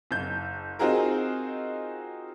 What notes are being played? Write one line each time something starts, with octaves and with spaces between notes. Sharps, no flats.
F#1 G6
C4 D#4 F4 F#4 G#4 A#4